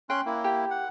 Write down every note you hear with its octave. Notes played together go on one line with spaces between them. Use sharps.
C#4 G5 C6 F#6
A#3 E4
G4 G5
F#5